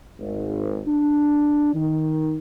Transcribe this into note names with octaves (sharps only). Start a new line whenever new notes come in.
G#1
D4
D#3